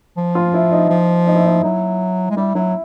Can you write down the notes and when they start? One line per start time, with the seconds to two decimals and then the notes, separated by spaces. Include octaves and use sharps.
0.17 F3
0.35 F4
0.54 E4
0.72 D#4
0.89 F3
1.27 D#4
1.35 E4
1.45 D#4
1.63 F#3 E4
2.30 G#3
2.37 G3 E4
2.55 F#3 E4